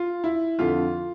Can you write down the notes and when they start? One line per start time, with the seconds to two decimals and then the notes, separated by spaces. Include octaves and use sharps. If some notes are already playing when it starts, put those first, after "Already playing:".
Already playing: F4
0.24 E4
0.59 F2 D3 F4